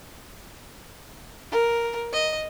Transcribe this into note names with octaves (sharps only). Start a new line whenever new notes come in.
A#4
D#5